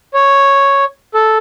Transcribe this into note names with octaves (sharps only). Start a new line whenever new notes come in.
C#5
A4